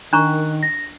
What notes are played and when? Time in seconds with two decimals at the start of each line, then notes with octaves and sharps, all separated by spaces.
0.13 D#3 D4 A#5 C#6 F#6
0.63 A#6